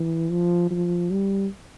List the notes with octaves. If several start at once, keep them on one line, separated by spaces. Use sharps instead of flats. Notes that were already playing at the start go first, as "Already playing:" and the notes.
Already playing: E3
F3
F3
G3